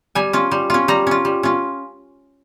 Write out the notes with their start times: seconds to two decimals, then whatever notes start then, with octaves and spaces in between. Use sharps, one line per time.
0.15 G3 G#5
0.33 C#4 F4
0.51 G3
0.70 C#4 F4
0.88 G3 A#5
1.07 C#4 F4
1.25 G3
1.43 C#4 F4